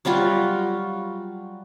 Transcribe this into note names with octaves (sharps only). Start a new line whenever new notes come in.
F#3 G3 F4 F#4